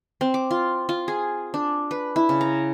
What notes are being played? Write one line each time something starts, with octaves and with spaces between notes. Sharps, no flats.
C4
D6
F4
F4
G#4
D4
B4
E4
C#3
A#5